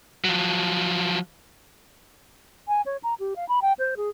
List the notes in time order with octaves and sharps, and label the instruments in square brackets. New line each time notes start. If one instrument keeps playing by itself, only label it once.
[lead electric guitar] F3 F#3
[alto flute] G#5
C#5
A#5
G4
F5
B5
G5
C5
G#4